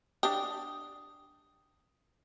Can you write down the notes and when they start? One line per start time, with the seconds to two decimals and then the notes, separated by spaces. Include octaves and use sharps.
0.23 D4 G4 D#6